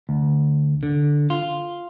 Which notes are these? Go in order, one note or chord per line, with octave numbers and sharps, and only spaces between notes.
D2
D3
F4